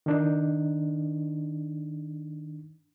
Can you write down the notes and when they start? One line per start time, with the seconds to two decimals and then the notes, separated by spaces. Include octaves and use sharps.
0.06 D#3 D4 D#4